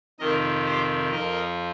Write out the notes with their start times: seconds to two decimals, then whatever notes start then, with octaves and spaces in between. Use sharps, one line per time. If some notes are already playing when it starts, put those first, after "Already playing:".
0.19 F2 C3 D#3 A#4 D#5
0.65 G4 C5
1.11 F2 F3 A#4 D#5